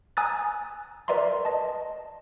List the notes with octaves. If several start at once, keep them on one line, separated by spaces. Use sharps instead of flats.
G#5 A#5 D#6 E6 F#6 A6
A#4 B4 D5 E5 A#5 C6
D#5 A5